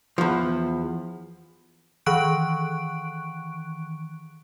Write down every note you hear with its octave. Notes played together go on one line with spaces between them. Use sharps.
E2 F3
D#3 E3 C#6 F#6 D7